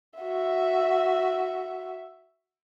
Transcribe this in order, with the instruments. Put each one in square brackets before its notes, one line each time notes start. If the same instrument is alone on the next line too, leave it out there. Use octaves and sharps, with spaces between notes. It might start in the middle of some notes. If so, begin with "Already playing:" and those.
[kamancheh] F#4 E5